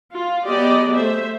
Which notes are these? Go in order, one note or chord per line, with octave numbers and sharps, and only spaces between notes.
F4
F#3 B3 G4 G#4 D5 D#5
A3 C5 E5